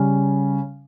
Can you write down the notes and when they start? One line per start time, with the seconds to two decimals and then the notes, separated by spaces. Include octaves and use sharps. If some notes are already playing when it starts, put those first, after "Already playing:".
Already playing: C#3 G3 C#4